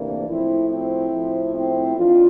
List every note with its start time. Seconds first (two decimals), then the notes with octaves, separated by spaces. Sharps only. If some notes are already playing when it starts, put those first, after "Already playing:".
Already playing: D2 C3 E3 A#3 D4
0.27 A2 F3 C4 E4
0.68 C4 E4
1.11 A2 F3
1.53 C4 E4
1.96 F2 E3 D4 F4